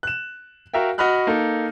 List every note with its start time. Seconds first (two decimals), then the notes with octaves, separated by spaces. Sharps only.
0.03 F#6 E7
0.74 F#4 A#4 E5 F5 G5
0.98 F#4 D#5 F#5 B5 F6 F#6
1.27 A#3 D#4 A4